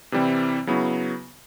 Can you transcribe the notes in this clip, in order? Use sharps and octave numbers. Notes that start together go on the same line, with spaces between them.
C3 E3 G3 C4 E4
C#3 F#3 B3 E4